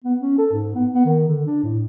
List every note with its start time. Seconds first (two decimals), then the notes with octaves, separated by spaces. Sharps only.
0.04 B3
0.20 C#4
0.38 A4
0.53 G#2
0.75 B3
0.94 B3
1.06 D#3
1.27 D3
1.46 D4
1.63 A2